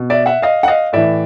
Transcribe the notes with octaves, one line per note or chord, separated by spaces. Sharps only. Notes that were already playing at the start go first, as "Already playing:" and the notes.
Already playing: B2
D5 E5
E5 F#5
D#5 F5
F#5
D#5 F5
A2 E3 D5 E5